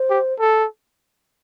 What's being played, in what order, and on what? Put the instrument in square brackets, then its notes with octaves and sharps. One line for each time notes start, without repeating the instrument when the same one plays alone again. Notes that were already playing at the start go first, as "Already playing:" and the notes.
Already playing: [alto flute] C5
[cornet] G4
A4